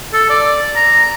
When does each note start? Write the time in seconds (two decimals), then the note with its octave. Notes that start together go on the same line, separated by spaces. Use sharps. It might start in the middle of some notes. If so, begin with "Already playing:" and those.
0.13 A4
0.30 D5
0.76 A#5